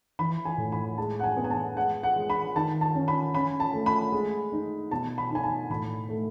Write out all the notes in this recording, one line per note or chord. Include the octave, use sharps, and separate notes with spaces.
E3 B5
G#5
A2
B5
G#3 A5
F#5
G#5
B3
G#5
A5
G#3 F#5
F#5
G#3
B5
D#3 A5
A5
C#4
B5
C#4 B5
A5
A3
B5
G#3
D#4
B2 A5
B5
D#4 G#5
A5
A2 B5
A3